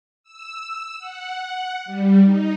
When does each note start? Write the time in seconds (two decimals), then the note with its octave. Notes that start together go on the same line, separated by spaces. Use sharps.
0.23 E6
0.99 F#5
1.85 G3
2.23 D#4